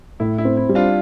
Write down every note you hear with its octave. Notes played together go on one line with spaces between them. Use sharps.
A2 E4
E4
C4
E4
G3
D4 F4